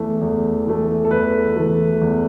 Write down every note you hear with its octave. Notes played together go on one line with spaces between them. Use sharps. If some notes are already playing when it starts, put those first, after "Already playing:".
Already playing: E2 E3 A3
E2
E3 A3
A4
E2 B4
E3 A3
E2